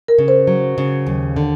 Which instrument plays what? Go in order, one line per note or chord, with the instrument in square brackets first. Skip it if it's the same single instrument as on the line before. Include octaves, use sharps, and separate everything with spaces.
[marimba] A#4
[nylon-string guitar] C#3
[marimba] C5
[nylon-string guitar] F#3
C#3
D#2
D3